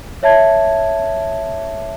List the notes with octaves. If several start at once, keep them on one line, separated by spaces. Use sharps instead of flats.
C#5 E5 A5 G#6